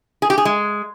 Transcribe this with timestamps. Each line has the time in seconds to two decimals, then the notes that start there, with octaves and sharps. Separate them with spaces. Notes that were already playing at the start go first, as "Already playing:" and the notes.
0.22 G#4
0.30 G4
0.38 G#4
0.45 G#3